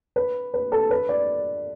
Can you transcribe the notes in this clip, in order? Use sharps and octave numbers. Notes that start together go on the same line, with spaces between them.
B4
B4
A4
B4
D5